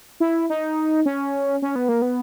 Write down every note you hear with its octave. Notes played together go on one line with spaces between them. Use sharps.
E4
D#4
C#4
C#4
B3
A#3
B3